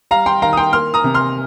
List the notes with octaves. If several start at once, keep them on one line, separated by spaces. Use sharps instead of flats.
G3 F5 A#5
G5 C6
D#3 F5 A#5
D#6
G5 C6
A#3 C6 F6
A#5 D#6
C3
C6 F6